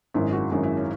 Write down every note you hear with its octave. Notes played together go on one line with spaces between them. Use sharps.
G#1 F#2 D#3 G#3 E4
F#4
G#1 F#2 D#3 G#3 E4
E4
C#4